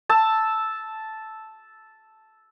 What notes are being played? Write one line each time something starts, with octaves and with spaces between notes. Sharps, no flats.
A5 E6